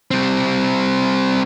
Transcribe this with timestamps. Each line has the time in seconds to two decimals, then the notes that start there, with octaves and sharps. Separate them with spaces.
0.11 G3 C4